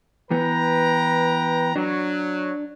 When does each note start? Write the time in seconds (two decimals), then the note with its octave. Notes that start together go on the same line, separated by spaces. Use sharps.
0.31 E3 B3 B4 G5 A#5
1.75 F#3 D4